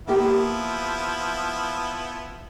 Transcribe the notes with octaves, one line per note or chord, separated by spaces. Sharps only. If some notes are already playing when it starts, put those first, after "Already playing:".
F3 A#3 B3 E4 G4